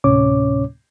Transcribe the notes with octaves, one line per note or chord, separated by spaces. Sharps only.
D2 A2 C3 C#4 C#5 D6